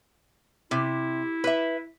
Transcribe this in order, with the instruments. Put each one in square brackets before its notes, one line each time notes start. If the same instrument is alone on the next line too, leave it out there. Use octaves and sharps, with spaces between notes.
[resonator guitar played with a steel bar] C3 [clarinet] E4
[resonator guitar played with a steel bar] B4 E5